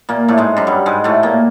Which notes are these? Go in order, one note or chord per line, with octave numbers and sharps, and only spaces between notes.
A#2 A#3
A2 A3
G#2 G#3
F#2 F#3
G2 G3
G#2 G#3
A2 A3
A#2 A#3